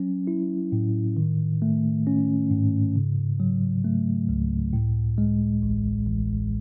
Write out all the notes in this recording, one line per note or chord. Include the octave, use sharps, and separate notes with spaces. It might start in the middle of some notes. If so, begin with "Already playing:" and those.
Already playing: F#3 C#4
E4
A2
D#3
A3
C#4
G#2
C#3
F#3
A3
C#2
A2
G#3
A1
A1